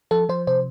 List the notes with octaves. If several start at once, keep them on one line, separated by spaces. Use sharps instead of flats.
F3 A4
F3 C5
C3 C5